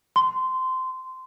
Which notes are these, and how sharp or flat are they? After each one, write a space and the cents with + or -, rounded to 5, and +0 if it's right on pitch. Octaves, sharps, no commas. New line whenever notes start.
C6 -20